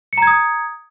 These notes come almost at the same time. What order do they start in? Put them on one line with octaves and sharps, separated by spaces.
C#7 A#5 G#6 D#6